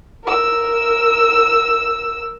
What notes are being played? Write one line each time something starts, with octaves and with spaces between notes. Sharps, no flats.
A#4 E6